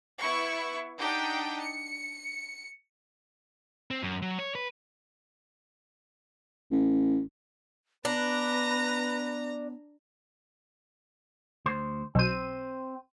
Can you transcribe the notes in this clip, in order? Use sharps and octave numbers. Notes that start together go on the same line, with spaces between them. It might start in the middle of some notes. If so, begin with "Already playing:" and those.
B3 E4 C#6
D4 D#4 G4 F#5 G5
C#7
C4
F#2
F#3
C#5
B4
A1
B3 D4 B4 A#5 A#6
D2 C5
B1 C4 C5 D#7